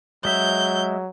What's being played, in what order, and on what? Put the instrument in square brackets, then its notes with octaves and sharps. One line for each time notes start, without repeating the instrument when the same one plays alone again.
[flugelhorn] F#3 [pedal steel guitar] G#3 E5 [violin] G6